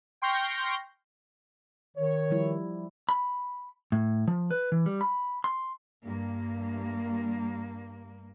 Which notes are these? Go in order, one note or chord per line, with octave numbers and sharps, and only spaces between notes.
G5 C6 C#6 F6 G6 A#6
D#3 C#5
F3 G3 E4
B5
A2
F3
B4
E3
G3
B5
C6
G2 A#3